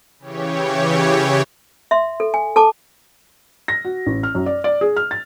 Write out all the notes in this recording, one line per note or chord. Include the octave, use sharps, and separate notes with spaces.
C#3 E3 G4 C#5
E5 C6
A4
G#5
A4 A5 D6
A#6
F#4
A1
F6
F#2
D5
D5
G#4
F6
A6